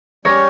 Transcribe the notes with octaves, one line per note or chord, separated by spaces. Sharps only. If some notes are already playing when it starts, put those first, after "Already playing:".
G3 C#4 G4 A#4 C#5